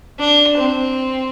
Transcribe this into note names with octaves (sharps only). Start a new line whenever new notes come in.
D4
C4